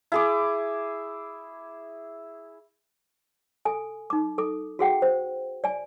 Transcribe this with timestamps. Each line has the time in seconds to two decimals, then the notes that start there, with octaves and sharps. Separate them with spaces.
0.12 E4 G#4 D6
3.65 A4 G#5
4.10 D#4 D6
4.38 A4 D6
4.79 F#4 G#4 F#5 G5
5.02 C5
5.64 D5 G#5